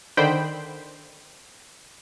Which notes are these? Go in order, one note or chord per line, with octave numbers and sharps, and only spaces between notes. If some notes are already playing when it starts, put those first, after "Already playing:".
D3 D#3 C5 G5 B5